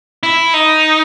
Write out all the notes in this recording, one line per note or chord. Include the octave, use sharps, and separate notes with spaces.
E4
D#4